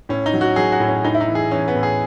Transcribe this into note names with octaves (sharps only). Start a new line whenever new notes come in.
A2 C#4
D#4
F#3
F#4
F#3 G#4
F#4
A2
C#4
A2 D#4
E4
D#4
E3
G#4
E3 C#4
B3
A2
G#4